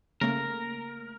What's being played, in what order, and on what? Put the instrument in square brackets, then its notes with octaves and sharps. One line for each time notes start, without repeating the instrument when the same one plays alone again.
[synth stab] C#3 A3 A#3 [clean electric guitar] A#4